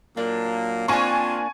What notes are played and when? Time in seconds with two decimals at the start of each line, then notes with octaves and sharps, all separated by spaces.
0.17 A#2 F#3 A#3 D4
0.88 A#3 C4 D4 F4 G#5 C#6